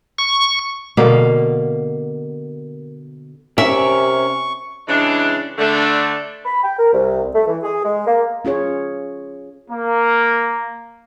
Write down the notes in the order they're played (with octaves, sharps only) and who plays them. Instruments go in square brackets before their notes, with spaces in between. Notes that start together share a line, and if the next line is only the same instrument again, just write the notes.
[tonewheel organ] C#6
[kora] B2 D3 A#3 F5
[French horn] C3 [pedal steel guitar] C#4 A#4 D5 [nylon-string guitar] E5 [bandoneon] C#6
[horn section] C#3 E3 G#3 D4
D3 A3 D4
[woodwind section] B5
G5
A#4
C2
A3
E3
G#4
G#3
A#3
[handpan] C#4 F4 G#4 C#5
[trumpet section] A#3